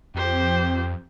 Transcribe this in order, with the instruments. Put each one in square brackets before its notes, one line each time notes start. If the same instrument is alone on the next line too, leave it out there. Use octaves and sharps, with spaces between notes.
[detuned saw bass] F2 [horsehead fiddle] G4 C5